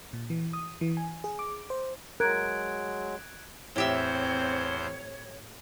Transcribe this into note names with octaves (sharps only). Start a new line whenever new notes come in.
A#2
E3
D#6
E3
G#5
G#4
D6
C5
F#3 G#3 A#4 F#6 G#6 D7
E2 A2 C4 G4 C5 C#5 E5 G6